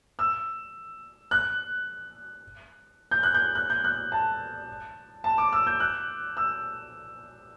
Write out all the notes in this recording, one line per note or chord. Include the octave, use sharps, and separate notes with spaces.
E6
F#6
G6
F#6
G6
F#6
G6
F#6
A5
A5
D6
E6
G6
F#6
E6